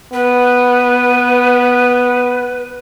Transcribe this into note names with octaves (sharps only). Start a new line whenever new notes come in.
B3 B4